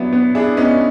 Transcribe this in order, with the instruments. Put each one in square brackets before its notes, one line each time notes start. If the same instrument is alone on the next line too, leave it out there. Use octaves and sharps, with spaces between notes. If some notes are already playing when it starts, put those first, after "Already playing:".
Already playing: [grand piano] F#3 B3 [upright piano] D4 E4
[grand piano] B3
[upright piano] D4 E4 [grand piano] G#4
[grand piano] B3 [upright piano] C#4 D#4